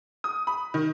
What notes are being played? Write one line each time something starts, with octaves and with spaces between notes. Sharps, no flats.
D#6
B5
D#3